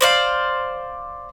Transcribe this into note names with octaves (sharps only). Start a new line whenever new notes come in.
C5 D5 F5